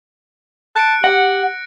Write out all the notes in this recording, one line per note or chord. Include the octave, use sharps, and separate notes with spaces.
A5 F#6 C#7 D7
G4 F#5 A#6